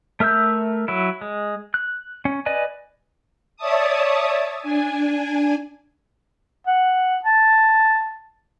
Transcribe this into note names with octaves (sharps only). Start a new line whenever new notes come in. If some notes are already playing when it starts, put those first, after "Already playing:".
A3 A#4 E5 E6 G6
F#3 E4
G#3
F#6
C#4
B4 D5 D#5 G#5
C#5 D5 E5 A5 D#6
D4 G#5
F#5
A5